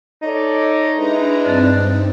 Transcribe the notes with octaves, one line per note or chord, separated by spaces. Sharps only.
D#4 A4 C#5 D5
G#3 D4 E4 B4 A#5
G2 C4 D4 D#4